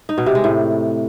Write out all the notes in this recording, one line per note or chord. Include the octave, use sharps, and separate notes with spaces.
D#4
B2
C3
G#3
A2